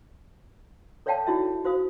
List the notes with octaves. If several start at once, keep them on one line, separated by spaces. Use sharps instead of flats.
A4 C#5 D5 F5 G5 A5
D#4 E4 F#4 G#4 E5
F#4 C5 F5 D#6